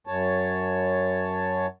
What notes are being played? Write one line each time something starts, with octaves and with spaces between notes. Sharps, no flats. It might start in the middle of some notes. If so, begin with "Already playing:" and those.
F#2 C#5 A5